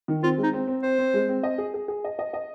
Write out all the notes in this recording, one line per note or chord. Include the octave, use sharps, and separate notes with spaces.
D#3
C4 F4
G#3
D#4
C4
C4
C4 C5
C4
G#3
C4
D#5
G#4
G#4
G#4
D#5
D#5
D#5